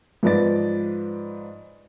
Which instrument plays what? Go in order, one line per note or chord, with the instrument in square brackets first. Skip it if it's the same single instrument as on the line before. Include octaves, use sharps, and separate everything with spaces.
[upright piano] G#2 F3 B4 D5 A6